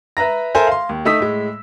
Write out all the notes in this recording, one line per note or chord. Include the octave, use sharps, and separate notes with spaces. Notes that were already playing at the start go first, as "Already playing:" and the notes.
B4 E5 A#5 A#6
A4 A#4 C5 E5 G#5 A#5
F5 C6
D#2
A3 D#4 D#6 E6 B6
A2 G#3